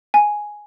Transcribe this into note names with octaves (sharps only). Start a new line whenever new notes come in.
G#5